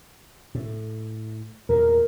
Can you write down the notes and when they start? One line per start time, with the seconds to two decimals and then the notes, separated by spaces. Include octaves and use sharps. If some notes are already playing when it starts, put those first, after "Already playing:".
0.55 A2
1.69 E2 A#2 A#4